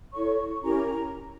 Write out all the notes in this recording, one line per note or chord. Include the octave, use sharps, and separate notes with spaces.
E4 A4 C#5 C#6
C#4 E4 G4 A#4 A#5